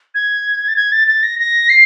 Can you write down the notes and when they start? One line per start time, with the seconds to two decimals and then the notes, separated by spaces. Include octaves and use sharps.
0.15 G#6
0.68 A6
0.76 G#6
0.92 A6
1.08 A6
1.23 A#6
1.39 A#6
1.69 C7